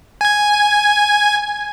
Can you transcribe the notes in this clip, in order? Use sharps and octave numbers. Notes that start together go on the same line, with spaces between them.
G#5 G#6